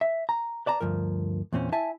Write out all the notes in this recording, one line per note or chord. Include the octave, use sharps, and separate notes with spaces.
E5
A#5
B4 D5 A5 A#5
D2 G2 F3 A#4
E2 A#2 C4 C#4
E4 E5 G#5 A5